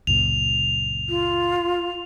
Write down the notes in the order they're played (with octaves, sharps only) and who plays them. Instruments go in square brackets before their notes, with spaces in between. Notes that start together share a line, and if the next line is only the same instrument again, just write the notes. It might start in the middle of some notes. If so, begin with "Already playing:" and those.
[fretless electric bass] C#2 F#2 A#2 [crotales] F7
[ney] F4